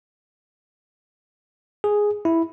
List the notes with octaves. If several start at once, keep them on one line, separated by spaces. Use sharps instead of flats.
G#4
E4